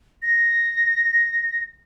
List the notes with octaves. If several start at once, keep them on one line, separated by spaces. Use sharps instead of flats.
A#6